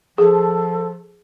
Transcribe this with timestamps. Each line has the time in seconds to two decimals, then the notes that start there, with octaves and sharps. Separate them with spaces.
0.18 F3 G#4 A4